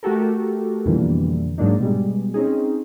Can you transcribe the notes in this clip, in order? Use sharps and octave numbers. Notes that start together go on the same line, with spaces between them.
A3 F#4 G4 A4 A#4
F2 B2 D3 E3 G3 A#3
G#2 F#3 A#3 D4 D#4
B2 G3 G#3
C4 C#4 D#4 G#4